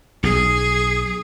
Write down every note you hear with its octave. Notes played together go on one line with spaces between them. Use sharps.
B1 G#4